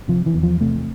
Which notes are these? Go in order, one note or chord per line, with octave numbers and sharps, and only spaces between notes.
C3 F3
E3
E2
F3
C3 A3